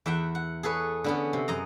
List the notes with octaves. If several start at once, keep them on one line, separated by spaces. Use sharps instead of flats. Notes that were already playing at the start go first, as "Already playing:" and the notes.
E2 E5 F#5 G5
F#5
G#4 A4 B4 C#5
D3 B3 C#4
C3
F#2 D#5 A#5